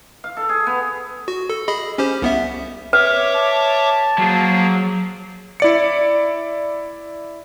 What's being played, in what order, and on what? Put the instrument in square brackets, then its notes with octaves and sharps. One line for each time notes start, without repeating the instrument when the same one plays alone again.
[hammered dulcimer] F5
A4
G#4
B3
[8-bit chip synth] F#4
A4
G#4 D#5 B5
C#4 G4 C5
C2 B3 E5
[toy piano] B4 [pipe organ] C#5 E5 D6
[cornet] A5
[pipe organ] F3 A#3 G#4 [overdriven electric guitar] F#3
[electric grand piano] E4 D5 C#7